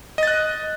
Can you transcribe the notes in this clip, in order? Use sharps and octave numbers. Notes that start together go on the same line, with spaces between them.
D#5 F#6 A6